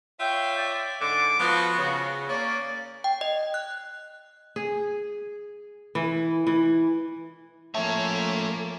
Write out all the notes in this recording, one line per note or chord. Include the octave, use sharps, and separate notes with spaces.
F4 C#5 E5 G5
D5
G#2 D3 D6
F3 B3 F#4
C#3
A#3 C#4 D5
G5
D#5
F#6
G#4
E3
E3
F3 A3 A#3 C#4 C#5 E5 A5